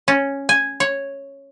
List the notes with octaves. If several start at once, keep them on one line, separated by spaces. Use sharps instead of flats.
C#4
G#5
C#5